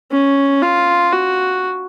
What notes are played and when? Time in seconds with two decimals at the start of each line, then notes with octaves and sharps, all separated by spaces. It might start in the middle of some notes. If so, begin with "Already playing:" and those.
0.12 C#4
0.62 F4
1.13 F#4